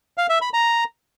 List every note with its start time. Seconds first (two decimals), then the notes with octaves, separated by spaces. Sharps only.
0.18 F5
0.30 E5
0.42 B5
0.54 A#5